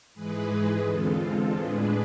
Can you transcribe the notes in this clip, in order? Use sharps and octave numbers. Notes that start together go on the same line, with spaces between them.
G#2 E3 G#3 G#4 B4
G#4 B4
E2 D3 G#3 C4 F4 A4
A2 G#3 D4 G#4 B4